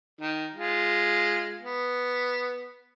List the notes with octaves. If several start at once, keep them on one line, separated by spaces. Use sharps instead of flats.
D#3
G#3 F4
B3